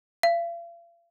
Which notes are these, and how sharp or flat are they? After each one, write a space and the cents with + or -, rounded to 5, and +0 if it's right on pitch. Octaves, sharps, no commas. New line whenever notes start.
F5 -45